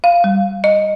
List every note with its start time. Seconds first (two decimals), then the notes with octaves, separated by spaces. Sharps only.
0.04 F5
0.24 G3
0.64 D#5